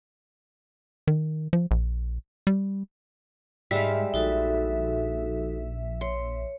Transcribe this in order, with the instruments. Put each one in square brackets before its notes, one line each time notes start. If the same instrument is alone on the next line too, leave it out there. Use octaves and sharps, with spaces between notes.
[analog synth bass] D#3
F3
A#1
G3
[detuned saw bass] G#2 [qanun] G3 G#3 F5 [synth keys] E5
[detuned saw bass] A#1 [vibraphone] D#4 F#4 A4
[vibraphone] C#5 [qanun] C6